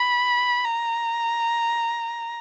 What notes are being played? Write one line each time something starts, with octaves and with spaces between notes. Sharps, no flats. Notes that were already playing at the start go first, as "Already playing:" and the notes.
Already playing: B5
A#5